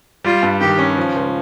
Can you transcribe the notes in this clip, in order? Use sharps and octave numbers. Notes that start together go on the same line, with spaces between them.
G3 F4
G2
D#3 G4
C#4
F3
C#2